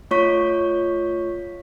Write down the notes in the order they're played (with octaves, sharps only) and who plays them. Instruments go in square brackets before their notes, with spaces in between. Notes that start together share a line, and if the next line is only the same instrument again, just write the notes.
[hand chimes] A3 F4 C#5 C#6 B6